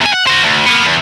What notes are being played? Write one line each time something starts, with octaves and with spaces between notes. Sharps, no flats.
E2 G#5
F#5
F#4 C5
D2
A#3 B3
E2